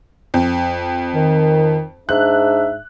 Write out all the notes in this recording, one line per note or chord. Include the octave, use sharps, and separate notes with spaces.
F2
D#3
G#2 D4 E5 F#6